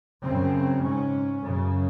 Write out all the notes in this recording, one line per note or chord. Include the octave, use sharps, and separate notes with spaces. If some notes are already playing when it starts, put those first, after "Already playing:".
F#2 C#3 C4
G#2 C#4
F#2 C#3